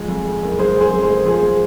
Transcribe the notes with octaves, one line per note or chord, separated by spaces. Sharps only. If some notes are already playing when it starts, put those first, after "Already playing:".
Already playing: F3 G#3 G#4
F2
F2
F#1
G#3 G#4 C5
F#1
G#4 C5
F2
G#4 C5
G#3
F3 G#4 C5
G#3